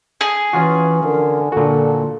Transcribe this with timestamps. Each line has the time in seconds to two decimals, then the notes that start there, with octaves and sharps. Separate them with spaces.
0.21 G#4
0.53 E3 C#4 F4 F#4
1.04 D3 A#4
1.52 A#2 D3 F#4 A4